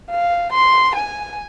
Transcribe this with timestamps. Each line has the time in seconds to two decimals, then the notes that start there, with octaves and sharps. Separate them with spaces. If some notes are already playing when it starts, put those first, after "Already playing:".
0.11 F5
0.52 C6
0.96 G#5